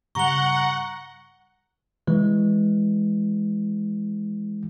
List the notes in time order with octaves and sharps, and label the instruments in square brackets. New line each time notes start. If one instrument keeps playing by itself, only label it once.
[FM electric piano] G2 C#3 G3 [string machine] F#5 [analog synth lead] A#5 [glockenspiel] C#6 G7
[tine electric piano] E3 G#3